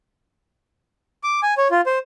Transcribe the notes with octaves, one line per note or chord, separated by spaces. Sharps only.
D6
G#5
C#5
F4
C5